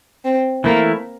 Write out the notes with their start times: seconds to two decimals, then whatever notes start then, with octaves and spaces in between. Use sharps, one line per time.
0.25 C4
0.64 E3 A3 A#3 E4 A#4